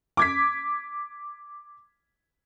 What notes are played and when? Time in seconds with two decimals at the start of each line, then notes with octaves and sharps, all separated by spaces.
0.17 D6 G#6 B6